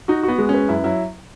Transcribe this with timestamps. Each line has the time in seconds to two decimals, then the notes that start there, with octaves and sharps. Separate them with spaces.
0.08 D#4 F#4
0.23 B3 F#4
0.38 G#3
0.49 C#4
0.54 B4
0.68 F#2 E4
0.84 F#3 E4